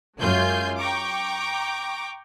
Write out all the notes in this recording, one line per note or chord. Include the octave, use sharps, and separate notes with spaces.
F#2 G#3 F4 G#5 C6 G6
G5 A#5 C#6 D6